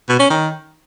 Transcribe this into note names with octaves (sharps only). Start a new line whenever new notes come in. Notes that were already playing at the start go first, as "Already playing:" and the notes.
B2
C#4
D#3